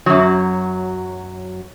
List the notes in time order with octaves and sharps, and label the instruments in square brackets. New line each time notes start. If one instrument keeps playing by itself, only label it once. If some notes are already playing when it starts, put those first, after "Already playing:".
[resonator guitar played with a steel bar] F#2 F#3